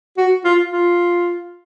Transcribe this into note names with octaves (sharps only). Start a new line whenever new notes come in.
F#4
F4
F4